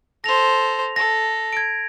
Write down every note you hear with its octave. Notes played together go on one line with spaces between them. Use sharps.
A4 C5 A#6 F7
A4 A#6
G#6 D7